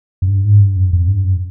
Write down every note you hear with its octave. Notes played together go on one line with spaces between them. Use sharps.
F#2
G2
G#2
G2
F#2
F2
G2
F#2